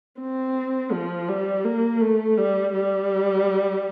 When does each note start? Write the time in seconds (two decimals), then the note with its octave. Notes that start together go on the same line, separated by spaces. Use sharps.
0.20 C4
0.93 F3
1.28 G3
1.64 A#3
2.01 A3
2.37 G3
2.73 G3